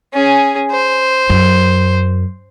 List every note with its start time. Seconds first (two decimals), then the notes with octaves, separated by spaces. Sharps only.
0.13 C#4 G#4
0.72 C5
1.30 F#2